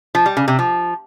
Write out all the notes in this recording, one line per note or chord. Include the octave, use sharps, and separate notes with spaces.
F3
G3
C#3
C3
F3